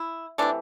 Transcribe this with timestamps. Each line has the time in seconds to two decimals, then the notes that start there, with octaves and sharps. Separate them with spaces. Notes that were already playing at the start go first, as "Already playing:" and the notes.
Already playing: E4
0.38 C3 E3 A3 D4